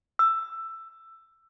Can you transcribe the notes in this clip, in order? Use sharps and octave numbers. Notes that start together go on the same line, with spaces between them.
E6